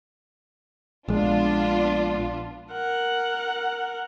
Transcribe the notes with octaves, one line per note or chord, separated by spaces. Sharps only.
A#1 G#3 B3 D4 F4
A#4 F#5